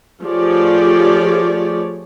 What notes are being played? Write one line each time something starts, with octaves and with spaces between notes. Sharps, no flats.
F3 A3 G4 G#4 C#5 D5